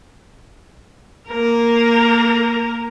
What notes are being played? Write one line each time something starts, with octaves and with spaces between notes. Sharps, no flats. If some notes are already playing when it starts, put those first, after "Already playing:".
A#3 A#4